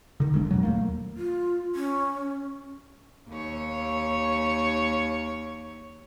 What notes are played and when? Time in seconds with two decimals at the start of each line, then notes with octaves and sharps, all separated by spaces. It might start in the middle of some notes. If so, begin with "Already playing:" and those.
0.20 D3 D#3
0.33 E1 B1 G#3 D4
0.51 E2 B2 F#3
0.63 D#2 A3 A#3
1.17 F4
1.75 C#4
3.29 D#2 C#5